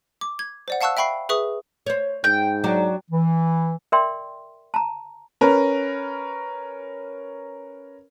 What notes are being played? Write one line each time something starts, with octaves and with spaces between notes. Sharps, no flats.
D6
G#6
C5 D5 F#5
F5 F#5 A5 C#6 E6 F#6
E5 G5 B5 C#6 C7
G#4 B4 E5 C#6 D#6
C5 C#5
G#2 G5
F#3 D4 F#4
E3
A#4 D5 E5 G5 C6
A5 A#5
C#4 A#4 B4